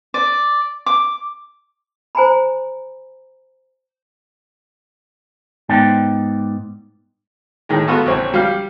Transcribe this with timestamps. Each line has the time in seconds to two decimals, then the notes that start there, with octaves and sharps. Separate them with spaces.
0.14 D5
0.86 D6
2.15 C5 G#5 A#5 B5
5.69 G#2 B3 D#4 D5 G5
7.69 A2 D#3 G#3
7.88 A3 B3 F4 F#4 A4
8.06 A#1 E3 C4 C#5
8.34 G3 F5